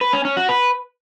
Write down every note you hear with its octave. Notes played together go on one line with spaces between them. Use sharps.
B4
C#4
C#4
F#4
B4